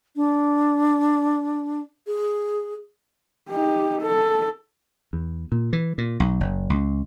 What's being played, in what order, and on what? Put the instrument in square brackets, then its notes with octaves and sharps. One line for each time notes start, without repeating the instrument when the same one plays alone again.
[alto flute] D4
G#4
[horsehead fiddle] D#4 G4
A4
[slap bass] E2
A#2
E3
A#2
B1
F#1
C#2